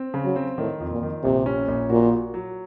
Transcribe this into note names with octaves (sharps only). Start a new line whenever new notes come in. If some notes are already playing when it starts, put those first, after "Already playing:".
Already playing: C4
C#3
F#3
C4
A2 D#3
F2
A#2
D#3
A#1 C3
C#4
A#1
A#2 F#4
F#4
F#3